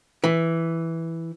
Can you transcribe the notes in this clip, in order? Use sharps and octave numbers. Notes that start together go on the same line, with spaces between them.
E3